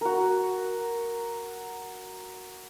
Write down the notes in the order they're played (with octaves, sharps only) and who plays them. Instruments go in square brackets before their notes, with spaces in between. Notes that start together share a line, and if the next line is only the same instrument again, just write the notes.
[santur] F#4 A#4